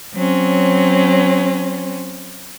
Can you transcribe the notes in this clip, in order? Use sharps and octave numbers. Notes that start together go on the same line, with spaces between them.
F#3 C4 C#4